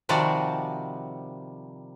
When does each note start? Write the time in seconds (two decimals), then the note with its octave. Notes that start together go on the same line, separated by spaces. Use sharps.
0.09 C3 D#3 F3 G3 F#4 D5